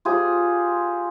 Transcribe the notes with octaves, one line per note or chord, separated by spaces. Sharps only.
F4 G4 G#4 C5